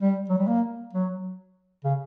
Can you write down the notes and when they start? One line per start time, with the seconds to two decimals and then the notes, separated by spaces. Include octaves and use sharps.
0.01 G3
0.29 F#3
0.38 G3
0.47 A#3
0.93 F#3
1.84 C#3